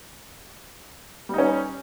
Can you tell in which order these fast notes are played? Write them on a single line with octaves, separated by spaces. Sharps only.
G3 D#4 C#4